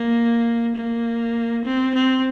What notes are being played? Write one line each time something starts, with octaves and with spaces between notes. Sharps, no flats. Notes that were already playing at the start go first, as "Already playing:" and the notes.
Already playing: A#3
A#3
C4
C4